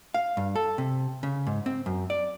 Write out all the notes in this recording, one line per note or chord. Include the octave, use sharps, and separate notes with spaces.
F5
G2
A4
C3
C#3
G#2
C4
F#2
D5